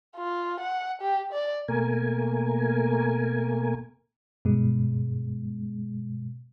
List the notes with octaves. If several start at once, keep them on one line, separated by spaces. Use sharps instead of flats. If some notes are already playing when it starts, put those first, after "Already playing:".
F4
F#5
G4
D5
B2 A3 A#3 A#4 G#5
G2 B2 G#3